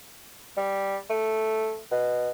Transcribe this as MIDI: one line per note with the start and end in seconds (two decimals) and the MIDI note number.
0.57 0.98 55
1.10 1.77 57
1.91 2.30 47